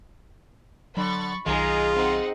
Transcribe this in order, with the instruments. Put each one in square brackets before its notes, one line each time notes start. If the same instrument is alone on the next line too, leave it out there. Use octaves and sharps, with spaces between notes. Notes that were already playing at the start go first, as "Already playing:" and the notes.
[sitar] D3 [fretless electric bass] F#3 [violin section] B5 C#6 A6
[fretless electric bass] B1 D#3 [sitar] G#3 [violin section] D#4 G#4 A#5 [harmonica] F4
[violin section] C4 D#4 F#5